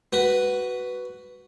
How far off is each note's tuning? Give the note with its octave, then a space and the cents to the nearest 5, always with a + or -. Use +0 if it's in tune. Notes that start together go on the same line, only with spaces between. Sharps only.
F#4 +10 B4 +0